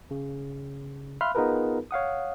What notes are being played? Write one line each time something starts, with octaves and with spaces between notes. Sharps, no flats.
C#3
E5 F5 B5 C6 F6 F#6
B3 D#4 F4 G#4 A#4 B4
C#5 F5 F#5 D#6